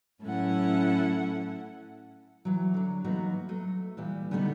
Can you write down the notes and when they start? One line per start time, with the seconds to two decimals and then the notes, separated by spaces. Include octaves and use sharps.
0.22 A2 F#3 C#4 E4 A4 F#5
2.45 E3 F#3
2.74 D3 F#3
3.04 E3 F#3 A#3 B3 D#4 F#4
3.49 F#3 A3
3.97 A#2 E3 G3
4.31 D3 G3 A3 B3 D4 D#4